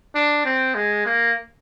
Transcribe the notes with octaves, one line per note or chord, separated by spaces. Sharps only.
D4
C4
G#3
A#3